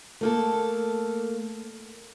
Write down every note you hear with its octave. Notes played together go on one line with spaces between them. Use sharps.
A3 A#3 A4